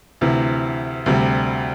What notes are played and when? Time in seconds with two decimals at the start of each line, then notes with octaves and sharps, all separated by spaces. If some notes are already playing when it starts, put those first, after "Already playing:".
0.21 D2 C3 E3
1.06 D2 C3 G3